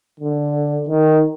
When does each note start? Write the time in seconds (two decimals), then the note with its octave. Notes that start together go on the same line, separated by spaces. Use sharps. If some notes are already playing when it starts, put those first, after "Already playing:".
0.20 D3
0.89 D#3